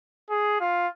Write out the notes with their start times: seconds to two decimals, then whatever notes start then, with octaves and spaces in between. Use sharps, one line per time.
0.30 G#4
0.60 F4